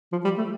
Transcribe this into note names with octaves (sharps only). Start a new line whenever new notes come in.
F3
G3
A3